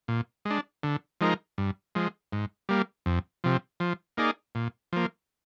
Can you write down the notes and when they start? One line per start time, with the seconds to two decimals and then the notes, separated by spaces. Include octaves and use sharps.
0.08 A#2
0.45 G#3
0.51 D4
0.83 D3
1.21 F3 G#3 D#4 A#4
1.58 G2
1.95 F3 G#3
2.32 G#2
2.69 G3 A#3
3.06 F2
3.44 C3 F3
3.80 F3
4.17 A#3 D#4 G#4 D5
4.55 A#2
4.93 F3 A#3